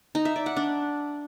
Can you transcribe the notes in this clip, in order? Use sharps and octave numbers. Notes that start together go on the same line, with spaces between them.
D#4
E5
D5
F#5
D4